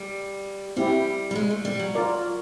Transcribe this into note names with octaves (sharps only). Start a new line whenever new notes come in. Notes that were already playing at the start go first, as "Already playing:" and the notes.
Already playing: G3
G3 C4 E4 G4
G3
G#3
A3
G3
F#3
F4 A#4 D5